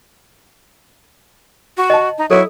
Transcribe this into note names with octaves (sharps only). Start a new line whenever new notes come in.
F#4
D#5 A5
D#4
F#3 E4 A4